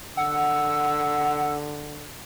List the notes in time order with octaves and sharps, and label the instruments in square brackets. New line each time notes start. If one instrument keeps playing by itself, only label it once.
[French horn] D3 [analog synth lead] F#5 [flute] E6